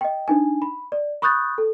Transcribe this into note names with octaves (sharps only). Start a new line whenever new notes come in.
D#5 G5
D4 D#4 G#5
B5
D5
B5 C#6 D#6 F#6 G6 A6
A4